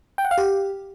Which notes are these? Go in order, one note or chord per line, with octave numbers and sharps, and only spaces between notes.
G5
F#5
F5
G4